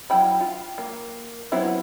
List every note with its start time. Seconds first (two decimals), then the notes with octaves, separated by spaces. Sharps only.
0.10 F#3 E4 G5 B5
0.41 F4
0.78 A#3
1.52 F#3 B3 C4 E4